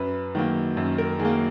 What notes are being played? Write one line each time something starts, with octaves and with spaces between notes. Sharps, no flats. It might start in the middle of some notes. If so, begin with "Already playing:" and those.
Already playing: F#2 B4
D#3 F#3 A#3
F#2
A#4
D#3 F#3 A#3 G#4